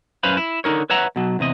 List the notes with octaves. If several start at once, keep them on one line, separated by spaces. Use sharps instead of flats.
F#2 C#4 B4 C5 F5 B5
E4
D3 D#4 A#4 C#5
B4 C#5 E5 F#5 A#5
B2 F#3
E2 C3 D#5